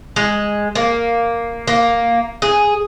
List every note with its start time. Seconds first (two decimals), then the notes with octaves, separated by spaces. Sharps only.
0.16 G#3
0.75 A#3
1.67 A#3
2.42 G#4